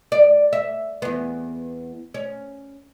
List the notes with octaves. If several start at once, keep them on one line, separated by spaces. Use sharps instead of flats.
D5
E5
E2 B3
C#4